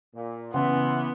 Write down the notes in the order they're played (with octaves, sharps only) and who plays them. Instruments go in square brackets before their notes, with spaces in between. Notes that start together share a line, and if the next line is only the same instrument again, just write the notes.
[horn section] A#2
[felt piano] C#3 F#5 [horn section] E3 [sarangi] B3 [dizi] C6